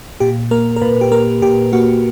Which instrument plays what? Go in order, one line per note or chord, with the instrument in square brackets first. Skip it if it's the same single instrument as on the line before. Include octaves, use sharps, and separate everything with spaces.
[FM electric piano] A#2 G4
A#3 A#4
A#4
A#2 B4
G4
A#3 A#4
A#2 G4
A#3 F#4